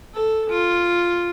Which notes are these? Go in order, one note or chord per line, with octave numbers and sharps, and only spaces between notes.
A4
F4